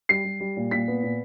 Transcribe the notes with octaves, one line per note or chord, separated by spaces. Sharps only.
G3 C7
G3
G3
A#2
A#2 B6
B3
A#2